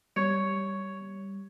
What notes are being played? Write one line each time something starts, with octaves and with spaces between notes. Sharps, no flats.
G3 C#5